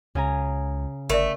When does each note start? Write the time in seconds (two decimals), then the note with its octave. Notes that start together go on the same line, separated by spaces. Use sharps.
0.15 C#2 C#3 G#5 A#5
1.10 G1 A3 A#4 D5